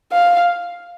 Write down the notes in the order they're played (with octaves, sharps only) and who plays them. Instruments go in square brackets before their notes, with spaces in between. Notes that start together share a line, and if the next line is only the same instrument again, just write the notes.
[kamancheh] F5